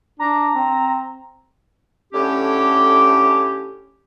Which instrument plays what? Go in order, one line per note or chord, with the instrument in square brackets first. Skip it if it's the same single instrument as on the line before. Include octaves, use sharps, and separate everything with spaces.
[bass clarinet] D4 [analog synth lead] A#5
[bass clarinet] C4
[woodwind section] A2 D3 C#4 G4